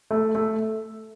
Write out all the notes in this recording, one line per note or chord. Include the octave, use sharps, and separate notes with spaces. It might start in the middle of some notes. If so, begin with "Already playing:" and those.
A3
A3